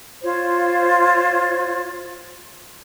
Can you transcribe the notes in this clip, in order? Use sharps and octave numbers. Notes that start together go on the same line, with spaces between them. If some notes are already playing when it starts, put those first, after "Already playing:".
F4 C5 C#5